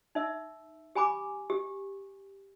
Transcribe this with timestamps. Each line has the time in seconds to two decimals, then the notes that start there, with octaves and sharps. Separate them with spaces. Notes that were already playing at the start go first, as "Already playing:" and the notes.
0.15 D#4 E5 E6
0.95 G4 G#5 B5 D6
1.50 G4